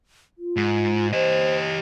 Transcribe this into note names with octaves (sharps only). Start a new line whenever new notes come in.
F4
G#2
G4 C5 D#5